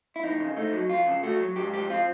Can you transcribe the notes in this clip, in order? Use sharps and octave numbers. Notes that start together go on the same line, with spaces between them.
E4
F2 D#4
C#3
A3 D#4
F#3
F2 F4
C#3
A3 F#4
F#3
G#2 G4
F3 G4
C4 F4